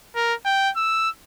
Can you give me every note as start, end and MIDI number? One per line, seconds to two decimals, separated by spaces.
0.15 0.34 70
0.45 0.70 79
0.76 1.09 88